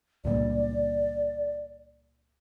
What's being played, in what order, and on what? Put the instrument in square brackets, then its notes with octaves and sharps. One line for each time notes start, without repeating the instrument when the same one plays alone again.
[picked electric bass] C#2 G2 A#2 [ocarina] D5